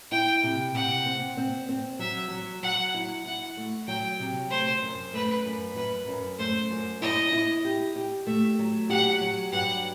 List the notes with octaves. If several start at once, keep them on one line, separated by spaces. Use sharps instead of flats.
E4 G5
C3
C3 F#5
C4
C4
C4
F#3 E5
F#3
F#3 F#5
E4
E4 F#5
A3
F#3 G5
C3
A3 C5
F#2
A3 B4
F#2
F#2 B4
F#2
A3 C5
F#2
E4 D#5
E4
G4
G4
A3 E5
F#3
G4 F#5
F#3
G2 F#5